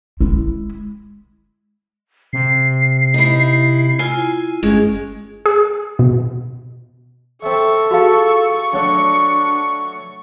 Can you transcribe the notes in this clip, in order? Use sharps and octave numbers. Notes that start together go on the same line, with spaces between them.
G#3 E4
C3 C7
D#4 E4
E4 F4 G#5
G1 G#3 C#4 G#4
G#4
B2
C4 A4 E5 C#6
F4 F#4 G#4 F5 A5
F#3 A3 D4